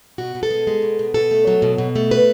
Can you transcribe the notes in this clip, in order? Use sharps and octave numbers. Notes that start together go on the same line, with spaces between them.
B2 F#4
B2
A4
G#3
G#3
B2
B2
B2 A4
A3
F#3
B2
B2
A3
B4